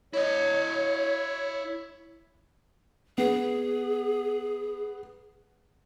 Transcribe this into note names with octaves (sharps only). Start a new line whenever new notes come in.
E4 C#5 D#5
B3 G#4